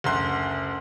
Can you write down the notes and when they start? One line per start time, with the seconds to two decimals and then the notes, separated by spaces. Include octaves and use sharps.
0.04 F#1 D2 C6 F#6